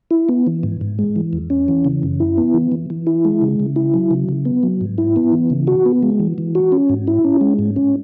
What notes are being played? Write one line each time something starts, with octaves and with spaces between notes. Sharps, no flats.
E4
B3
E3
G#2
G#2
G#3
E3
E2
C#4
E3
C#3
F#2
E4
B3
E3
E3
E3
E4
G#3
C#3
C#3
E4
F#3
C#3
C#3
B3
F#3
G#2
E4
B3
E3
C#3
F#4
B3
G#3
E3
E3
F#4
C#4
G#2
E4
C#4
G#3
G#2
C#4